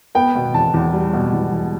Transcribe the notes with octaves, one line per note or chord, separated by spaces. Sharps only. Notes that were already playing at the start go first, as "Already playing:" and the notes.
B3 G5
B2
E2 A5
E2
G3
B2
E2
E2